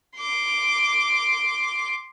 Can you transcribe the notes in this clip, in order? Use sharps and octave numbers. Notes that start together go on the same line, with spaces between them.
C6 D6